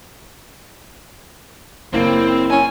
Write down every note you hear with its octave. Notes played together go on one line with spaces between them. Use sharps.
F#1 A#3 C4 E4
C#4 G#5